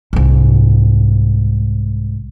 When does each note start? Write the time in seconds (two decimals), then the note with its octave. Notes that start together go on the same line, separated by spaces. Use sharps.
0.13 C2 G#2